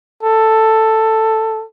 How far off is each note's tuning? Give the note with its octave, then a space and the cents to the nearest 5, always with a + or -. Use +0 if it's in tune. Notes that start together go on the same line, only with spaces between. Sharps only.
A4 +5